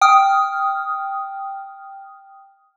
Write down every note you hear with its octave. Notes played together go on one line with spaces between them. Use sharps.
G5 D#6 F6